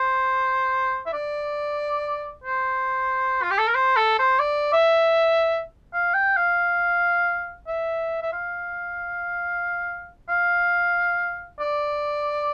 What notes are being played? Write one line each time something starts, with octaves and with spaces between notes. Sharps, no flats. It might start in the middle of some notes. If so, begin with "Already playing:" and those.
Already playing: C5
E5
D5
C5
F4
G4
A4
A#4
C5
A4
C5
D5
E5
F5
G5
F5
E5
E5
F5
F5
D5